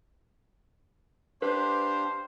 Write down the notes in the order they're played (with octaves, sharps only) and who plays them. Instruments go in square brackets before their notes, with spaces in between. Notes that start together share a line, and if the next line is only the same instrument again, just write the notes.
[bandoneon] D4 G4 F5 [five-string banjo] B4 [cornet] C5